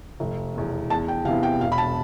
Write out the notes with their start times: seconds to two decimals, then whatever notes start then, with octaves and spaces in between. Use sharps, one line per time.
0.20 F1
0.54 E2 B2
0.90 E2 A5
1.08 G5
1.25 C3 F5
1.28 E3 B3
1.43 G5
1.61 E1 F5
1.72 B5
1.78 A5